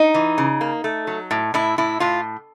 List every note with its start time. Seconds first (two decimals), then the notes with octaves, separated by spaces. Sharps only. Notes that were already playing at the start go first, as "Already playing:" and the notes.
Already playing: D#4
0.14 E3
0.38 C#3
0.61 A#3
0.84 A3
1.07 F#3
1.31 A2
1.54 A2 E4
1.78 A2 E4
2.00 A2 F4